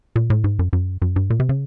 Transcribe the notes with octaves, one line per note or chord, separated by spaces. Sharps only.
A#2
A2
G#2
F#2
F#2
F#2
G2
A#2
C3
C#3